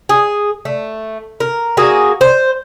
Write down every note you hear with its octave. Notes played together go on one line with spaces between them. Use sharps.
G#4
A3
A#4
A#3 F#4 G#4
C5